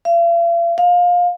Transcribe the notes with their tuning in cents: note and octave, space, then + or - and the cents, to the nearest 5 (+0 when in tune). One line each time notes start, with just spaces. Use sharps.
F5 -45
F5 +20